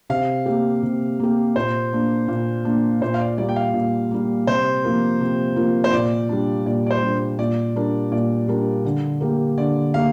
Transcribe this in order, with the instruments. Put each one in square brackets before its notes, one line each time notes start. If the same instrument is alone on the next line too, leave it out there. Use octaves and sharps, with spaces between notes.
[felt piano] C3 [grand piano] F5
[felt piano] A#3 G4
C3
A#3 G4
[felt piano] A#2 [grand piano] C5
[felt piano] A#3 D4
A#2
A#3 D4
[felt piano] A#2 [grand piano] C5
[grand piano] F5
D5
[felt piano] G3 A#3 [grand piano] D5
[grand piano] G5
F5
[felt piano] A#2
G3 A#3
[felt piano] C3 [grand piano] C5
[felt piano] F3 A#3 F4 A#4
C3
F3 A#3 F4 A#4
[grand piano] C5
[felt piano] A#2 [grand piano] D5
[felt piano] G3 D4
[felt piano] A#2 [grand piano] D5
[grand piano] D5
C5
[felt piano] G3 D4
[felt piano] A#2 [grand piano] D5
[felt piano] G3 D4 A#4
[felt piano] A#2 [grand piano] D5
[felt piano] G3 D4 A#4
D3
A#3 G4 A#4
[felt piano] D3 [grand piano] D5
[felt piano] A#3 G4 [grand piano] F5